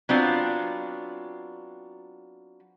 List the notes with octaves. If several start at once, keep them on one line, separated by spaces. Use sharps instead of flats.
F#3 B3 C4 D4 F4